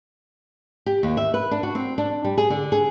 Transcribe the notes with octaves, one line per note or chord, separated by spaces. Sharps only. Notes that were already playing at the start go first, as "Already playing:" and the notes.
G4
D#2
E5
B4
D4
F#4
C4
D4
G3
G#4
D3
G#4